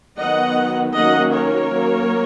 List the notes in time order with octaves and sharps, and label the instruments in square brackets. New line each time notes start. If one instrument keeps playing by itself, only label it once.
[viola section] D#3 F#3 B3 D#5 F#5
D#3 F#3 A#3 C#4 D#5 F#5
A#4 C#5
F#3 A#3 C#4